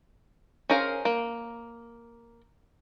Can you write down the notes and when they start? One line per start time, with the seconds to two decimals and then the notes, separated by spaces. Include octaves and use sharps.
0.69 C#4 G#4 A#4 C5 F5
1.05 A#3